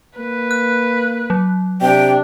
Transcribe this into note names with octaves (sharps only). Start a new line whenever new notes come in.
A#3 B4
F#6
F#3
C3 D4 G5